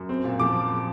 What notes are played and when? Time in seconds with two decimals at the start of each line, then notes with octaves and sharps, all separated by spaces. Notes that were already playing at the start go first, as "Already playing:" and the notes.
Already playing: F#2
0.09 C4
0.24 A#2
0.40 F3 D6